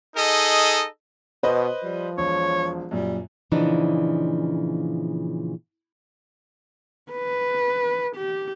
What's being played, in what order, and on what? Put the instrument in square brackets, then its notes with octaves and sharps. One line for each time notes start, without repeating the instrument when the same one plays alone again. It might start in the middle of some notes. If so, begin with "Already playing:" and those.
[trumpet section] D#4 G#4 A4 D#5
[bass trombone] B2 [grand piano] B4 C5 D#5
[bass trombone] F3 [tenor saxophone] G3
[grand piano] E1 [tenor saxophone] C#5
[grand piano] F#2 A#2 [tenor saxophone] G3
[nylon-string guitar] A#2 C#3 E3 F3 D4 D#4
[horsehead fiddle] B4
G4